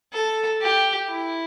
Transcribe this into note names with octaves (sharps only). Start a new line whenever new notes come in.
A4
G4
E4